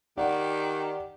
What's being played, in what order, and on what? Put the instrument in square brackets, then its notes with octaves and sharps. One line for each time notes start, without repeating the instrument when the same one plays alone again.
[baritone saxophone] D#3 [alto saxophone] G4 [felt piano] D5 F#5